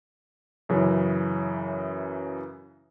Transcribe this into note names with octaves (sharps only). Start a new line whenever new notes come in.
F#2 C#3 E3